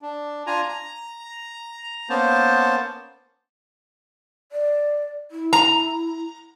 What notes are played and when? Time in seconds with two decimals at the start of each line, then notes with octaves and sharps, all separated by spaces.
0.02 D4
0.47 D4 F4 G#5 A#5
0.69 A#5
2.09 A#3 B3 C#4 C5 A5
4.52 D5
5.31 E4
5.53 A#5